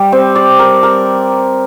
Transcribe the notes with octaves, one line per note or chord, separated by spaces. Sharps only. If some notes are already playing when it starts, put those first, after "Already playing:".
Already playing: G3 G4
C4
D5
A#4
A#4